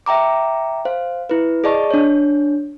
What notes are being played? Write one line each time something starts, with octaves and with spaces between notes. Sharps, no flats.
E5 G5 A#5 D6
C5 F5
E4 B4
G#4 D5 D#5 A5 C#6
D4 C#5